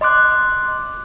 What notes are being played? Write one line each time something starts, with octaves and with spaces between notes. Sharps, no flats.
D#5 C6 D6 F#6